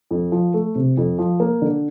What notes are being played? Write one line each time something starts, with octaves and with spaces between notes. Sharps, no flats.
F2
F3
A3
C3
F2
F3
A#3
D3